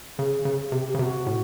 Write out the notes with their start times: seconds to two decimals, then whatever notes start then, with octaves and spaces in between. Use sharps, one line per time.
0.18 C#3 G#4
0.45 C#3 G#4
0.62 G#4
0.72 C3 G4
0.88 G4
0.94 C#3
0.99 C3 F#4
1.26 A2